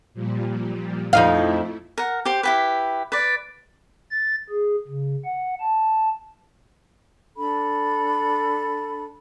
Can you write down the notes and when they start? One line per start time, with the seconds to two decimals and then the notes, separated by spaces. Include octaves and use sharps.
0.14 A#2 F3 G3
1.13 F2 F3 A3 D#4 E4 F5
1.98 A#4 F#5
2.25 G4 C5
2.43 E4 G4 B4
3.12 B4 D5
4.10 A6
4.49 G#4
4.88 C#3
5.25 F#5
5.60 A5
7.36 D4 A4 B5